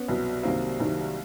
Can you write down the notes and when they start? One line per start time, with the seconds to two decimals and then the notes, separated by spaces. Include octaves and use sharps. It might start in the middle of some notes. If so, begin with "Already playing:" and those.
Already playing: B3 C#4
0.08 C2 B2 F#3
0.43 C2 C3 D#3 F#3 A#3 C4
0.80 C2 C3 D#3 F#3